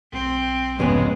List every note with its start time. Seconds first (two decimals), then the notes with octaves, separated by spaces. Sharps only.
0.13 B1 C4
0.79 F1 F2 G#2 C#3 G#3 B3